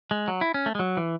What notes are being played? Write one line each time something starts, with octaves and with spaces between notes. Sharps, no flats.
G#3
F#3
E4
C#4
A3
G#3
F#3
E3